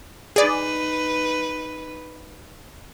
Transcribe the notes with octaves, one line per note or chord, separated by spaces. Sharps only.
D#4 G#4 B4 D5